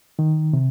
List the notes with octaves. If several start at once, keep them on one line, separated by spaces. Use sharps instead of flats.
D#3
C3